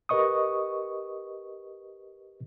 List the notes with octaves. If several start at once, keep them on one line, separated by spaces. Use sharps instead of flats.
G4 A#4 B4 D#5 C#6 D#6